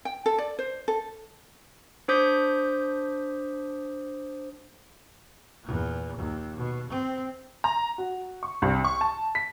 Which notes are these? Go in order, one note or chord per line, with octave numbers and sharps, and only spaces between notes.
G5
A4
D5
C5
A4
D4 C5 D6 D#6 G6 B6
E2 A#2
D#2
B2
C4
A#5
F#4
C#6
C2
C#6
A5
B6